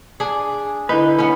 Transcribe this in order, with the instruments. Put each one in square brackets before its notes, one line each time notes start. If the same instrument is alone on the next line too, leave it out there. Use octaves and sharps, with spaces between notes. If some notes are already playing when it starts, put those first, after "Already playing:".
[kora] D4 G#4
[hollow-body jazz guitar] D3 B4 [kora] D#4 [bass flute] E4
[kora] B3 C#4